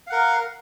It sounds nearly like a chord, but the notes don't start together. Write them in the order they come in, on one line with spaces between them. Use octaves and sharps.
F5 F#5 A#4